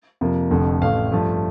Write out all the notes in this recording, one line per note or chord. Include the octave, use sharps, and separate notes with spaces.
F2 C3 F3 A#3
F1 F2 D3 A3
A1 A2 A3 F5
G2 F3 A3